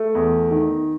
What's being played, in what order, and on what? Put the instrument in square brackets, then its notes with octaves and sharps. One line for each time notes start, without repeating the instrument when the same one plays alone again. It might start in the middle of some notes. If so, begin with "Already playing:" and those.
Already playing: [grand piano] A3
E2
D#3